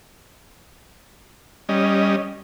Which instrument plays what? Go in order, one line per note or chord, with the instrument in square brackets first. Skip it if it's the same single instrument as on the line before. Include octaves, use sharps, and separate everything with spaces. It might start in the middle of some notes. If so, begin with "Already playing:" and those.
[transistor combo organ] G3 C#4 D#5